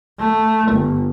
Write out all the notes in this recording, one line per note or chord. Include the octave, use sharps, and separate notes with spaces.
A3
G1